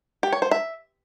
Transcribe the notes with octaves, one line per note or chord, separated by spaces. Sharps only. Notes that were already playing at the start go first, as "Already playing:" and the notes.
G4
C#5
C5
E5